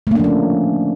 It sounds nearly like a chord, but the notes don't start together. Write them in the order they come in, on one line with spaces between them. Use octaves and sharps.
A3 A#3 D4 F3 C#4